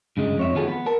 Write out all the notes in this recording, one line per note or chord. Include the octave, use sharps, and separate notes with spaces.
G2 C#3 G#3
F2 C#5 E5
D#3 F3 B3 F#4 G#4 A4
B3
A#4 A5